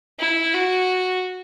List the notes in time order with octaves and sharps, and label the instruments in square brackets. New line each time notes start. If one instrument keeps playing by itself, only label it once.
[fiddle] E4
F#4